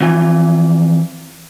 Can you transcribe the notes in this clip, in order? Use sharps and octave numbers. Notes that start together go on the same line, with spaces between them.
F2 E3 F4 G#5